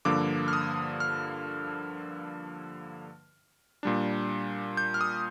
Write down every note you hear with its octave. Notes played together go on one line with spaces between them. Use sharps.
G2 D3 F3 A#3 D6
F6
D#6
F6
A#2 G3 D4
G6
F6
D#6